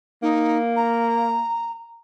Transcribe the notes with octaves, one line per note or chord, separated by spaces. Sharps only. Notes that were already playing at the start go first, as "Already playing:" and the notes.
A#3 D#4
A#5